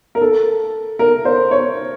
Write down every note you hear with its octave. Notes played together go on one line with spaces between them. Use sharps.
A#4
A4
A#4
C5
C#5